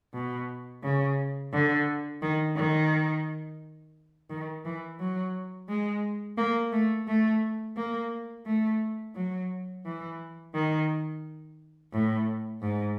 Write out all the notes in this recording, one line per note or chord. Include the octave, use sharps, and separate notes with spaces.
B2
C#3
D3
D#3
D#3
D#3
E3
F#3
G#3
A#3
A3
A3
A#3
A3
F#3
E3
D#3
A2
G#2